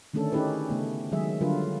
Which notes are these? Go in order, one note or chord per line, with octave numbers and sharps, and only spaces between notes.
D3 D#3 A3 C#4 D4 A4
C#4 D#4 E4 G4 G#4 B4
C#3 A3 B3
D#3 F#3 G#3 G#4 E5
D3 F#3 G3 F4 A#4 B4